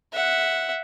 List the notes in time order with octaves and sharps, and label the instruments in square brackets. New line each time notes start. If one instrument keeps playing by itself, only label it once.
[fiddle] E5 F#5